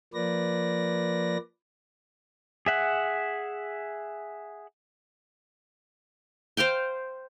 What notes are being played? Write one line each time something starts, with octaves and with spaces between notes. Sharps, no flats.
F3 A#3 B4 D5 A#6
G#4 E5 F#5
C5 F5 G5 C6